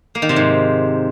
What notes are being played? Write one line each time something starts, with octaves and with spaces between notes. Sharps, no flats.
A#3
D#3
C3
G#2